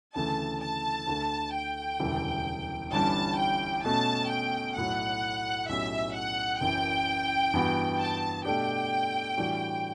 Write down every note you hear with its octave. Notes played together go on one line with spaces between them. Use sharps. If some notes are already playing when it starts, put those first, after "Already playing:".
D2 C#3 E3 A3 A5
A5
D2 D3 A3
G5
E1 D2 C#3 E3 G3
G1 G2 E3 G3 C#4 A5
G5
B2 A3 C#4 A5
G5
B1 A2 F#3 F#5
B1 A2 F#3 C#4 G4 E5
F#5
F#1 F#2 E3 G5
G2 E3 B3 F#4
A5
B2 A3 D4 G4 G5
A2 E3 G3 D4 F#4